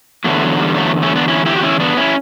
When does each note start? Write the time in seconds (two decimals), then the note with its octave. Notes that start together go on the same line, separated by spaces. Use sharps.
0.24 E2 D3 F#3 A3
0.43 F#3
0.60 G3
0.77 F#3 A3
1.02 A3 C#4
1.16 B3 D4
1.28 C#4 E4
1.46 E4 G4
1.56 F#4
1.63 C#4 E4
1.80 B3 D4
1.97 C#4 E4